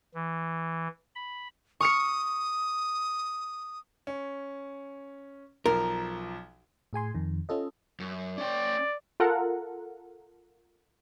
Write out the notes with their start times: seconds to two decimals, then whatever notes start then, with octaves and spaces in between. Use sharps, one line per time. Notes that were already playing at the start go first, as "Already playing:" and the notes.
0.15 E3
1.15 B5
1.81 C#6 D#6 F6 C#7
4.07 C#4
5.66 B1 F3 A#4
6.93 A2 G#4 G#5 C6
7.15 F2 D#3
7.49 C#4 F4 A4 D#5
8.00 F#2
8.38 C#4 D5 G5
9.20 F4 A4 A#4 F#5